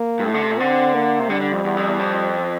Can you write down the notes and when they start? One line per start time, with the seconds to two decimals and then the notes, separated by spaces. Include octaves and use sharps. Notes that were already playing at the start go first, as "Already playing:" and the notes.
Already playing: A#3
0.20 G2
0.24 A2 A3
0.34 D3
0.42 C3
0.51 A#2
0.59 D3 C4
0.94 A#3
1.20 C3
1.30 D3 G3
1.41 D3
1.52 F2
1.64 E2
1.77 F2
1.87 E2
1.99 F2